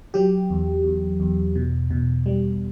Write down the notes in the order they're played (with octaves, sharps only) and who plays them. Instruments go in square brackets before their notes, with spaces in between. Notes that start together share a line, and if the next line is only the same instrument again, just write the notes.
[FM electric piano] F#3 G4
E2
E2
E2
B2
B2
G3